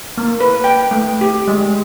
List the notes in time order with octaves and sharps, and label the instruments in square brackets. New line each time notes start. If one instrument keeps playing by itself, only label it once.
[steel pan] A#3
B4
G5
A3
G4
G#3